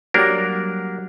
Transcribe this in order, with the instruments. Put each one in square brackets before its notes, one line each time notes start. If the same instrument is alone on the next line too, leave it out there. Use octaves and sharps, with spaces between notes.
[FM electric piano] F#3 G3 F#5 [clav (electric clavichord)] A#3 D4 A#4